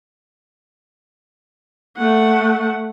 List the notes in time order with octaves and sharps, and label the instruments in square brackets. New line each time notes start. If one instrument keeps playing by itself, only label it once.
[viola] A3 F#5